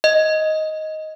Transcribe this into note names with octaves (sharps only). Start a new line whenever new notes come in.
D#5